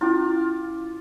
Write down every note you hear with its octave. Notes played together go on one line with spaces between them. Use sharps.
C#4 E4 F4 D6